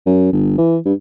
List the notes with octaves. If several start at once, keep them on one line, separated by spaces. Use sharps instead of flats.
F#2
G1
E3
G2